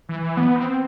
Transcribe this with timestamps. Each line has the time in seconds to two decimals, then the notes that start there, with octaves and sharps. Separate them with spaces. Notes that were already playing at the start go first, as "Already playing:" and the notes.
0.09 E3
0.22 E3
0.37 B3
0.55 C4